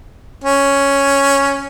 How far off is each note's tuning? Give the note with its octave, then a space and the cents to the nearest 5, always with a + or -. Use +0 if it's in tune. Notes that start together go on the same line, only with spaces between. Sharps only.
C#4 +0